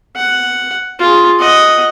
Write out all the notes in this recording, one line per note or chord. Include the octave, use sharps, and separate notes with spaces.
F#5
F4 G#4
D#5 F#5